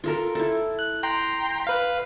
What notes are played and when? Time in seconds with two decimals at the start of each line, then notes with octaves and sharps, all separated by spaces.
0.04 F4 A4 A#4
0.35 E4 A4
0.79 F#6
1.03 G5 A#5 C6
1.64 B4 F5 B6